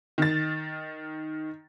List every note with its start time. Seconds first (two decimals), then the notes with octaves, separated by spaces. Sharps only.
0.18 D#3 A6